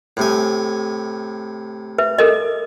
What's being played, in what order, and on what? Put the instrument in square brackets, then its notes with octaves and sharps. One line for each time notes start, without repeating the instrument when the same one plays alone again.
[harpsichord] A2 C3 G#5
[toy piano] B4 E5
A4 A#4 D#5